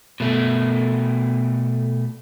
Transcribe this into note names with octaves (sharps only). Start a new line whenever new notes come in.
B2 A3